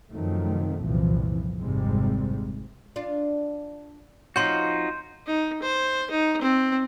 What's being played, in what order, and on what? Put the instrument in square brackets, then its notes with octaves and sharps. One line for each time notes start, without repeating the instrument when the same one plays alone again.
[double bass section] F#2 C3 D#3 F3 F#3 A3
F#1 C2 A#2 E3 F3
G#1 F2 G#2 C3 G3 G#3
[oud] D4 F4
[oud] F3 C4 C#4 [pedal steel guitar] D#4 F4 F#4 [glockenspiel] C6 G6
[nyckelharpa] D#4
C5
D#4
C4